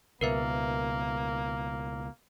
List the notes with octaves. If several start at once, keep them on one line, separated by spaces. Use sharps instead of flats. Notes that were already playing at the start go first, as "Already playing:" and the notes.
C#2 B2 A#3 A#4 B4 E5